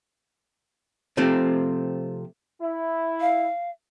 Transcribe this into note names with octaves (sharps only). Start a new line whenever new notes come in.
C3 F3 A3 C4
E4
F5